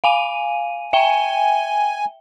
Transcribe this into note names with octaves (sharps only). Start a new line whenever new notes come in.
F5 G#5 D#7
E5 G5 G#5 G7